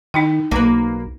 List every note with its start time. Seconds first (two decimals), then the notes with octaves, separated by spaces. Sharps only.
0.14 D#3 D#4 E4 G5
0.51 B1 A#3 B4